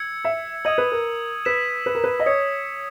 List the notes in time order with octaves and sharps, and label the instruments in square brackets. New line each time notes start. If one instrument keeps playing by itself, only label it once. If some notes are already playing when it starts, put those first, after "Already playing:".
Already playing: [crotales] E6 G#6 C#7
[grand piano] E5
[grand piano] D#5 [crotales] D#6 G#6 D#7 F#7
[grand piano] B4
A#4
[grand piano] B4 [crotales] E6 B6 E7
[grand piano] B4
A#4
B4
D#5
[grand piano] C#5 [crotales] D#6 G#6 C#7